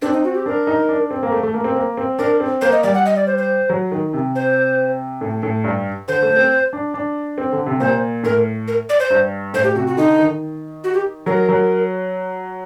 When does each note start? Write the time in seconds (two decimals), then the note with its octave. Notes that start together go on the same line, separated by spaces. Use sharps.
0.02 C4 D4
0.13 D#4
0.24 F#4
0.34 G4
0.46 D4 A#4
0.67 D#4
0.89 D4
1.11 C4
1.23 A#3
1.32 A3
1.43 A3
1.54 A#3
1.64 C4
1.75 A#3
1.97 C4
2.19 D4 A#4
2.40 C4
2.61 A#3 C5
2.72 D#5
2.83 G3 D5
2.94 F#5
3.06 D#5
3.16 D5
3.27 C5
3.38 C5
3.70 F#3
3.91 D#3
4.13 C3
4.35 C5
5.21 A2
5.43 A2
5.64 G2
6.08 D3 C5
6.22 A3
6.36 C4
6.73 D4
6.94 D4
7.38 C4
7.52 D3
7.66 C3
7.80 A#2 C5
8.23 A2 A#4
8.68 A#4
8.89 D5
8.99 C5
9.10 G2
9.53 A2 C5
9.64 G4
9.75 C3 F#4
9.87 F#4
9.97 D3 D#4
10.18 D#3
10.84 F#4
10.94 G4
11.26 F#3 A#4
11.49 F#3